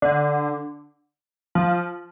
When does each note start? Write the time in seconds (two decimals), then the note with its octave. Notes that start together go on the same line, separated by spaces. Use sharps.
0.02 D3
1.55 F3